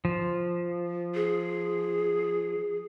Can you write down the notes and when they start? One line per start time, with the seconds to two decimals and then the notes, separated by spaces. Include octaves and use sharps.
0.05 F3
1.15 G#4